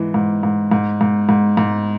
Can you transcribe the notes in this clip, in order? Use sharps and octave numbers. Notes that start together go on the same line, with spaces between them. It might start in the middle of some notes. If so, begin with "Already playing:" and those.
Already playing: G#2 E3
G#2
G#2
G#2
G#2
G#2
G#2